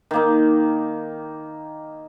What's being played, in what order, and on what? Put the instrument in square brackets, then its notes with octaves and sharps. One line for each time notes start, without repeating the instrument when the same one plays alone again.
[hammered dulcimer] D#3 A#3 D#4